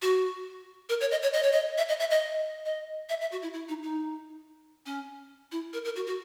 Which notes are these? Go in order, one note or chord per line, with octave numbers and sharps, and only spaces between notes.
F#4
A#4
C#5
D#5
C#5
D#5
C#5
D#5
E5
D#5
E5
D#5
D#5
E5
E5
F#4
E4
E4
D#4
D#4
C#4
E4
A#4
A#4
F#4
F#4